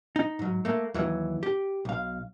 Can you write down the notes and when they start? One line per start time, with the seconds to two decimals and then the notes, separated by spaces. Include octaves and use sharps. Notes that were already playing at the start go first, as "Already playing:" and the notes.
0.16 D#4
0.39 G#2 F#3
0.65 A3 A#3
0.94 D#2 E3 F#3
1.43 G4
1.85 B1 F5